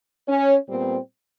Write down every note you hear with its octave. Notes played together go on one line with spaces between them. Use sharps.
C#4
A#2 G3 B3 C4